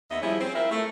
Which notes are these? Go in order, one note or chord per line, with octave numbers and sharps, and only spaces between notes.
D#2 B3 D#5 E5
F3 G3 C#4 E4 G#4 E5
C4
E4 F4 A#4 E5
A3